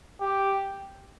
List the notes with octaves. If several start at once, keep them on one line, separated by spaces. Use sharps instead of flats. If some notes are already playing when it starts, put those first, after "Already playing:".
G4